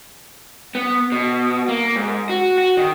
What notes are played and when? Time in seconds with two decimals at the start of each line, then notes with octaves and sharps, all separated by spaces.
0.75 B3
1.12 B2
1.68 A#3
1.96 G#2
2.29 F#4
2.58 F#4
2.77 D#3